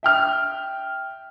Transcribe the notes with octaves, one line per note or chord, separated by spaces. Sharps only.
E5 G5 F6